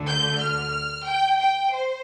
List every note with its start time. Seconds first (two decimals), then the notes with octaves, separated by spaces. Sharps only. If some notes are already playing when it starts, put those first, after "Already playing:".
Already playing: D2 D3 A3
0.09 G6
0.41 F6
1.06 G5
1.39 G5
1.73 C5